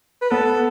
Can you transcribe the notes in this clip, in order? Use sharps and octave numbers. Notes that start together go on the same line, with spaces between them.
B4
B3 A4